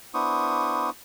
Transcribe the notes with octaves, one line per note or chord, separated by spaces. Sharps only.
B3 D4 E4 C5 C#6 D#6